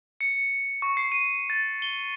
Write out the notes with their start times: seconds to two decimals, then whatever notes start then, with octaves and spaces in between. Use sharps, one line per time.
0.21 C#7
0.82 C#6
0.97 C7
1.12 D#7
1.50 A6
1.82 G7